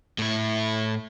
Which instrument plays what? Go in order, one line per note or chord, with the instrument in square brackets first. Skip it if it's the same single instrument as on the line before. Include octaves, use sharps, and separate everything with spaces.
[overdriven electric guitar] A2 E4